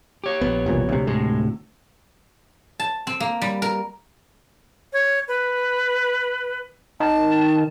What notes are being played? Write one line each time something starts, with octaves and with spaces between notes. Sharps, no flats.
G4 C#5
A#1 B3
E1 C2 A#2
D2 C3
A2 G#3
A5
C4
A#3
G3
A#4
C#5
B4
D#3 A5